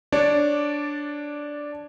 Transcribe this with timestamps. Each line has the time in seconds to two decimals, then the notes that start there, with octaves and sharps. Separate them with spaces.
0.12 D4 C#5 D5